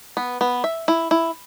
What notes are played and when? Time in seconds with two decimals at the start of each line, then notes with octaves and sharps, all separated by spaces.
0.17 B3
0.41 B3
0.64 E5
0.88 E4
1.11 E4